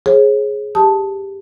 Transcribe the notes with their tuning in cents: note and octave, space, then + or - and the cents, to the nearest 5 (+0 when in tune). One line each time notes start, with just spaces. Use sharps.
G#4 +10 C#5 -40
G4 +5 A5 +0 D#6 +20